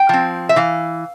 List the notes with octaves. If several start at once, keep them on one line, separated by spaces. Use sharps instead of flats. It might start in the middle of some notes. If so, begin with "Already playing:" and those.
Already playing: G5
F3 C4
E5
E3 F5